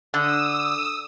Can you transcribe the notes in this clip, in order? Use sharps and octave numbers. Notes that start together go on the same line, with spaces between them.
D3 D#6 E6